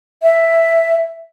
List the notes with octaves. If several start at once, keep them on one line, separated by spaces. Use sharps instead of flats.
E5